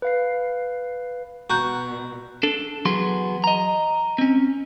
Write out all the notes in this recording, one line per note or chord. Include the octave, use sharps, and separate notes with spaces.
B4 F5 C7
B2 F#4 A#5 F#6 G6
D4 A4
E2 F#3 B3 G#4 C6
D#5 A#5
C4 C#4